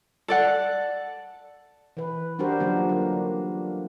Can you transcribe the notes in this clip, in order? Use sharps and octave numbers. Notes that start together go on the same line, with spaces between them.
A4 D5 F#5
E3 B4
G3 D4 F#4 G4 A#4 C5
D3 F3 F#3 A#3 D4
A#3